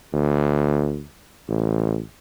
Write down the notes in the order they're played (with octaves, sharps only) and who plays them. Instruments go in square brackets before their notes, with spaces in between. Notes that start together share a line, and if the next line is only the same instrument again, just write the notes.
[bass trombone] D2
A1